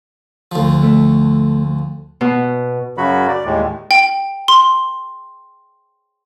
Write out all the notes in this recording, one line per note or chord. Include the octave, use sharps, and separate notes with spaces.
D2 F3
A3
B2
F#2 C#3 F#3 F#4 B5
D5
D#2 A2 G#3
G5
C6